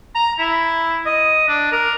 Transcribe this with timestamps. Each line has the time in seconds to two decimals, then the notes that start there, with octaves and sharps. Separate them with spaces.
0.15 A#5
0.39 E4
1.06 D#5
1.48 D4
1.72 A#4